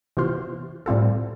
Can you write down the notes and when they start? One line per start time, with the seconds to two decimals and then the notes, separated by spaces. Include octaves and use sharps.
0.17 C3 E3 B3 F4 C5
0.86 A2 G3 C4 F4 A4